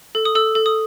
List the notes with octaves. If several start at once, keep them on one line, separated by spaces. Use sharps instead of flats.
A4
D#6
A4 E6
A4
D#6